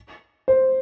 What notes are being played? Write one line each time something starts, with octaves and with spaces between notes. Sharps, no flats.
C5